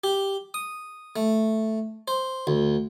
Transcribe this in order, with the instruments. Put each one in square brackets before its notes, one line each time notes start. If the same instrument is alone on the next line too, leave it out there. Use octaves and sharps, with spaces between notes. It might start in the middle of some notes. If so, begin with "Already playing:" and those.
[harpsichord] G4
D#6
A3
C5
D2